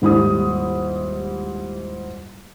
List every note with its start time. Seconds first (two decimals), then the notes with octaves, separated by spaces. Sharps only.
0.02 D#1 G#2 E4 G4 D#6